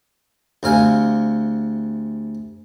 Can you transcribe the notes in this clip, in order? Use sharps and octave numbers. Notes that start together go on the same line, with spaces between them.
D2 C3 F5 G#5